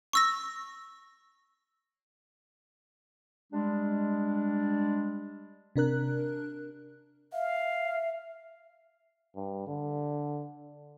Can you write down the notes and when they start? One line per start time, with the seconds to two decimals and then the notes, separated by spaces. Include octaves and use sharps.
0.13 C#6 E6 A#6
3.53 G3 G#3 D4
5.76 C3 D4 A#4 F#6
7.33 E5 F5
9.36 G2
9.67 D3